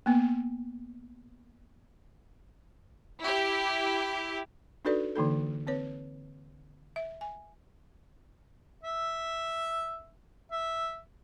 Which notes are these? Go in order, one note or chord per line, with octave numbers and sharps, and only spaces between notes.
A#3 B3
E4 G4
D4 D#4 F#4 A4 B4 D5
D3 E3 A#3 D#4 A4
C4 B4 C#5
E5
G#5
E5
E5